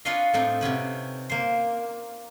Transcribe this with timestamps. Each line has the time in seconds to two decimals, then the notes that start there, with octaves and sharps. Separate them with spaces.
0.05 D4 F4 B4 C#5 D#5 F5
0.33 A2 C4 D4 D#4
0.61 C3 B3 C#4 B4
1.30 A#3 C5